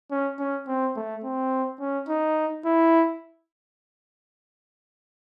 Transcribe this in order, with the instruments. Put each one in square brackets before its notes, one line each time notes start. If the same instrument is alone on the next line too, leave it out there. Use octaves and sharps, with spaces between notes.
[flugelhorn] C#4
C#4
C4
A3
C4
C#4
D#4
E4